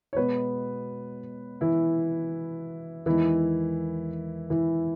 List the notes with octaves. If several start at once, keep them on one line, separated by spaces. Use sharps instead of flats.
C#5
B2 G#3 B3 B4
E3 E4
E2 D#3 E3 G#3 E4
E3 E4